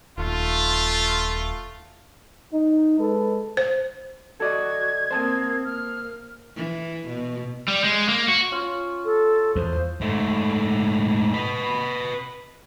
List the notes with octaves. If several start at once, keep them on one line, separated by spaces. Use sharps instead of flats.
D#1 A3 F4
D#4
G#3 A4 B4
C5
F#4 A4 D5 D#5 G#6
A#3 C4 C5 A5 D#6
A#3 F6
E3
B2
G3
G#3
A#3
F#4
C#4 F4
A4
E2 C5
G#2 A3
B4 D#5